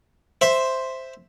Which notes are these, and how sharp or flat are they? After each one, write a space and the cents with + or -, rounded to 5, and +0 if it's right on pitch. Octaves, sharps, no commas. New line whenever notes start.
C5 +0 E5 +0